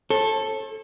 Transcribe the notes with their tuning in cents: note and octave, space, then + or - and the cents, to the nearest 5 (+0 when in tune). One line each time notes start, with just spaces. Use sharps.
A4 +0 C#5 -45